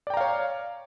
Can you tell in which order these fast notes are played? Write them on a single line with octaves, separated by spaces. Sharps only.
D5 G5 A#5 F5 C#5